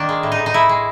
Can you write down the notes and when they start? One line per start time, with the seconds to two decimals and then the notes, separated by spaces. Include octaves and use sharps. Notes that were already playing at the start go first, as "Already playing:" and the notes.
Already playing: D#3 A#3 D4
0.09 G#3
0.23 A2
0.32 D#4
0.38 A2
0.46 D#4
0.54 A2 E4
0.69 G#3